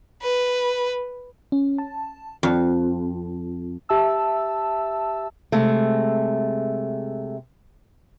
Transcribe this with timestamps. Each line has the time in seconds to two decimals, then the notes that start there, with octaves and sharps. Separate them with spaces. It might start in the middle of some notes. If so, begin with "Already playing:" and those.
0.22 B4
1.52 C#4
1.78 A5
2.43 F2
3.89 G4 E5 A5 E6
5.52 C3 G#3 A3